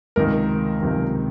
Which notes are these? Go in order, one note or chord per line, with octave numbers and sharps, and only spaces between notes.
C#2 C3 D#3 A#4
C#2 C3 D#3